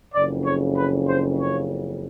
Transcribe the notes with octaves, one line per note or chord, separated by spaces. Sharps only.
F#1 F2 C#3 D5
C#5
B4
C5
C#5